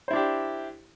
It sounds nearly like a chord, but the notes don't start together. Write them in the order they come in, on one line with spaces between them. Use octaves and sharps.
C5 E4 D4 G4